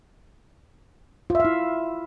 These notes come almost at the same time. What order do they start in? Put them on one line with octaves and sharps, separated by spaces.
F4 E5 F5 E4